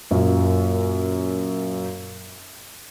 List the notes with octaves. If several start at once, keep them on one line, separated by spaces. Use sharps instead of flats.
F#2 A#2